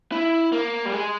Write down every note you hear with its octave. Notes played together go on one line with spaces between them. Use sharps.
E4
A#3
G3
G#3